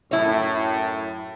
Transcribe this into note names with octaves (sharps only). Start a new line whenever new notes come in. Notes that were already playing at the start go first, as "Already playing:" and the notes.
F#2 A2 E4 C#5